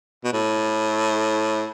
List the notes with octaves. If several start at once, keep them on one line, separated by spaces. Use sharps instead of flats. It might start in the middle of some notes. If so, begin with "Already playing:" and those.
B2
A2